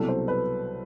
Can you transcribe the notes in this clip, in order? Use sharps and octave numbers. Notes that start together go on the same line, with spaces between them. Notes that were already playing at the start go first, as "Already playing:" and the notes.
Already playing: C2 B2 F#3 A4
C5
B4